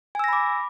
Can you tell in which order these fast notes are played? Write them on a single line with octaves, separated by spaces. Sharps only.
G#5 E6 A#6 B5 D6